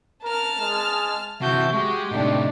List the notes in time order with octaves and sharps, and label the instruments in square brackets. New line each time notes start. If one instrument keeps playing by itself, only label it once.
[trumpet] A#4 [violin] A5 F6
[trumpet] G#3
[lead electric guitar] C3 E3 [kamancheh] F#4 [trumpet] E5 [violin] A5 G6
[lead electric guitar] G#3 [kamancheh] F#4 [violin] G4 [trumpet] C#6
[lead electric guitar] A2 C3 [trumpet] A3 [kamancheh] D4 D#4